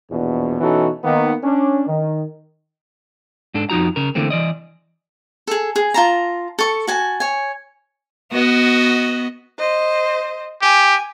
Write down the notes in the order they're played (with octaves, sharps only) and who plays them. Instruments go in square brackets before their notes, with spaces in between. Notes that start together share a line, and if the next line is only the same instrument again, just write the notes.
[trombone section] A#1 E2 B2
B2 E3 C#4 D#4 F#4 A4
D#3 A#3 B3
C#4 D4
D#3
[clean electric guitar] G#2 D4 A4
F2 F3 D#4 F#4 A#5
C#3 A#4
D3 E3 A3 A#3 C4
E3 D5 D#5
[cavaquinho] G#4 A4
G#4
F4 A5 A#5
A4 C#6
F#4 G#5 A5
C#5 G#5
[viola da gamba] B3 [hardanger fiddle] F#4 D#5
[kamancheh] C5 D#5
[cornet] G4 [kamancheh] G#5